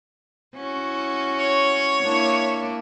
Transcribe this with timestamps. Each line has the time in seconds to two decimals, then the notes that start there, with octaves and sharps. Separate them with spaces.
0.56 C#4 E4 F#4
1.39 C#5
2.03 A#3 D4 E4